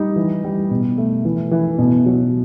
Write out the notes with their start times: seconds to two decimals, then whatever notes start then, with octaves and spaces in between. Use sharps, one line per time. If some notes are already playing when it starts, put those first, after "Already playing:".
Already playing: G3 D#4
0.16 E3
0.44 G3
0.71 B2
0.98 A3
1.25 E3
1.51 E3
1.79 B2
2.06 F#3